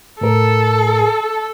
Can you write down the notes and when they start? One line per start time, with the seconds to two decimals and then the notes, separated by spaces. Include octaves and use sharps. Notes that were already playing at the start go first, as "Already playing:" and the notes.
0.21 A2 A4 A#4